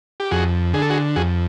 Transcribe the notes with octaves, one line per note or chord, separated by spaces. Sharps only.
G4
F2 F#4 G#4
D3 G#4
A4
F#4 G#4
F2 F#4 G#4